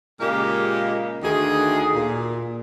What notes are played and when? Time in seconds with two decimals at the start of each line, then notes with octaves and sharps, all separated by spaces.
0.20 A#2 C#3 G#3 A#3 G4 A#4
1.22 D2 D#3 G#4
1.95 A#2